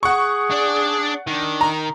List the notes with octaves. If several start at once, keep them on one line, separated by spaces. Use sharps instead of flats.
G#4 F#5 C#6
D4 D5
D#3 D4
A#5